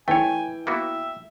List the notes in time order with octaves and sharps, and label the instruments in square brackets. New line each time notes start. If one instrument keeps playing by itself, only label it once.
[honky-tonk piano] E3 [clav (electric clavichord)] A3 C#5 [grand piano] G5 [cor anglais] G#5
[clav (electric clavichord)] A#3 B3 F#4 [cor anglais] E5